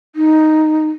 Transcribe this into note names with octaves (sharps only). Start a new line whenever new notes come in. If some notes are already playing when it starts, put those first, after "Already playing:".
D#4